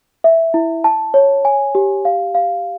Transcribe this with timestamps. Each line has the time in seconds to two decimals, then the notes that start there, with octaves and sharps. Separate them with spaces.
0.24 E5
0.54 E4
0.84 A5
1.14 C#5
1.45 G#5
1.75 G4
2.05 F5
2.35 F5